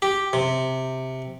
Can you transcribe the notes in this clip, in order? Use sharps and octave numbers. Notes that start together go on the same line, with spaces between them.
G4
C3